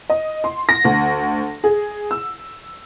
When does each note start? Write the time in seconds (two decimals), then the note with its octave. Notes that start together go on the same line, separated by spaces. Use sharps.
0.10 D#5
0.44 C6
0.69 A#6
0.85 D2
1.64 G#4
2.11 E6